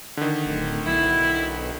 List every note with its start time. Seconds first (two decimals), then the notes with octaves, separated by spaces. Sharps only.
0.17 D3 D#3
0.45 D1
0.86 B1 E4